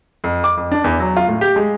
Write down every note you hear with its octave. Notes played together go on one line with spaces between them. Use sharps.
F2
D6
F2
D4
E2
F#3
F4
A2
G4
G#3